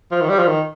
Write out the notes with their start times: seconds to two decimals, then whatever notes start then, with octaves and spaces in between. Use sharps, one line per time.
0.12 F3
0.21 D#3
0.29 G3
0.39 F3
0.47 D#3